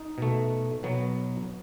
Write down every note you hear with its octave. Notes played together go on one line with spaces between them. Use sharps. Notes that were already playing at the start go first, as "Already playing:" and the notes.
Already playing: D#4
B2 A3
B2 F#3 B3